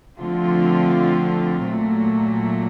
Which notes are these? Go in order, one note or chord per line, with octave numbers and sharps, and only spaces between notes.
D3 F3 A3 C4 F4
A#2 F#3 A3